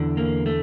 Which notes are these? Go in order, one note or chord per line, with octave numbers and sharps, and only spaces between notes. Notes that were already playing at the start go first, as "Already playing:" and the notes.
Already playing: E2 D3
A#3
A3